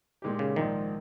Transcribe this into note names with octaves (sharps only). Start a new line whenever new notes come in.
A#2 G#3 D#4 G4
C#3
A#1 G#2 D#3 F3